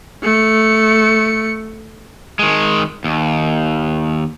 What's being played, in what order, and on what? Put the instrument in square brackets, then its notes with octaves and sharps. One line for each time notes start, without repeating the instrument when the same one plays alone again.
[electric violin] A3 C#7
[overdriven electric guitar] D#3 G#3
D#2